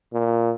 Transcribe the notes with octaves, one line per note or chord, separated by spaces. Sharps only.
A#2